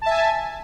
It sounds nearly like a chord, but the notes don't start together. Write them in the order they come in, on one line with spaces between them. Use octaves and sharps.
A5 E5 G#5